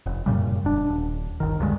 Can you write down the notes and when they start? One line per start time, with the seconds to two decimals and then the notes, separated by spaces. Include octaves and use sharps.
0.06 F1
0.26 F#2 A#2 C#3 G3
0.64 E1 D4
0.88 D#1
1.40 G1 D#3
1.59 A1 D2 G2 G#3